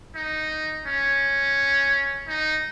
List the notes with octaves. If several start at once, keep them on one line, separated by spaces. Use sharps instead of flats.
D#4
C#4
D#4